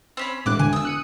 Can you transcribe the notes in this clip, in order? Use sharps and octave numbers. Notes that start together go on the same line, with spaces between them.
C4 C#4 B5
E1 A2 D6 F#6
D3 G#5
D#6 E6
F#6 C#7 D#7